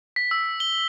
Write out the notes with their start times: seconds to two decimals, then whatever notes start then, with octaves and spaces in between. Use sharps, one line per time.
0.16 B6
0.31 E6
0.60 G7